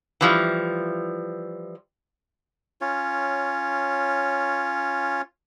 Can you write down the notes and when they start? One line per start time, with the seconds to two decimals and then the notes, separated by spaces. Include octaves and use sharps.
0.21 E3 F3 G3
2.81 C#4 F4 C#5